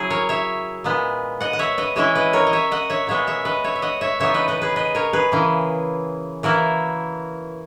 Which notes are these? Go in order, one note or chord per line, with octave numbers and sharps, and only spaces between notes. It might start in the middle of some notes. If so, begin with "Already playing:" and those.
Already playing: C#3 F#3 C#4 E4 G#4
A#4 C#5
C#5 E5
A#2 G#3 B3
D#5 F#5
F#5
C#5 E5
B4 D#5
E3 G#3 C#4 E4 C#5 E5
B4 D#5
A#4 C#5
D#5
C#5 E5
D#5 F#5
C#5 E5
A#2 G#3 B3 C#5 E5
C#5 E5
B4 D#5
C#5 E5
E5
D#5 F#5
C#5 E5
C#3 E3 B3 D#4 C#5 E5
B4 D#5
B4 D#5
G#4 B4
B4 D#5
A#4 C#5
G#4 B4
C#3 E3 A#3
E3 A#3 E4 F#4 A#4